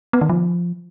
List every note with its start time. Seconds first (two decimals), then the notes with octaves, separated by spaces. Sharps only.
0.13 B3
0.21 D#3
0.29 F3